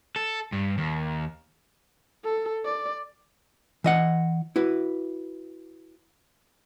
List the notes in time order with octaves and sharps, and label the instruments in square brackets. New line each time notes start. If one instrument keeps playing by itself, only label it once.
[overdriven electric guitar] A4
G2
D#2
[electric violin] A4
D5
[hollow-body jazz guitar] E3 D#5 F#5
E4 F#4 B4